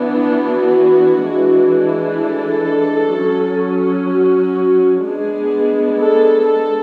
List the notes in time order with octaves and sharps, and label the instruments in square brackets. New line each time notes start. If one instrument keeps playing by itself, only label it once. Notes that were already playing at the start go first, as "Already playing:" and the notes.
Already playing: [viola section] E3 B3 D4
F#4
E3 G#3 D4
A4
F#3 C#4
F#4
G#3 B3 D4 G#4
A4
A4